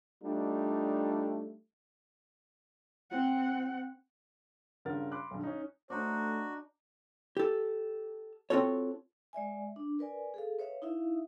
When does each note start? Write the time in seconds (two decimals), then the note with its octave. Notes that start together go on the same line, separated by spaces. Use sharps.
0.24 G3 A3 D4 D#4 F4
3.11 C4 F#5
4.85 G2 C#3 F4 A#4 F#5 A6
5.12 B5 C6 D6 F#6
5.31 B1 G2
5.44 C#4 D#4
5.90 A3 D4 D#4 F#4 C5
7.37 G4 A4
8.50 C4 F4 F#4 A4 C#5
9.33 G#3 D5 E5 G#5
9.76 D4
9.99 A#4 B4 D5 G#5
10.34 G#4 A4 F5
10.59 B4 C#5 E5 F5
10.82 D#4 E4 E5 F5